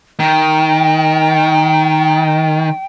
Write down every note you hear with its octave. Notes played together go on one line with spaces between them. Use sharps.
D#3 G5